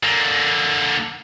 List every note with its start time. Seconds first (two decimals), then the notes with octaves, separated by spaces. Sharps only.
0.03 D3 A#3